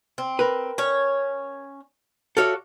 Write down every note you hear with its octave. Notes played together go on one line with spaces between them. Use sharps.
C4
A#4 B4
C#4 C#5
F#4 A4 C#5 D5 E5 F5